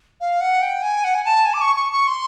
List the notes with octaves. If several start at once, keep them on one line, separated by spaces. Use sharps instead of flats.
F5
F#5
G5
G#5
F#5
G#5
A5
G#5
D6
C#6
C#6
C#6
C6